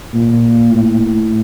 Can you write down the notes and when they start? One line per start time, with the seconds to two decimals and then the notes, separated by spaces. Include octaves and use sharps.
0.14 A#2
0.71 A2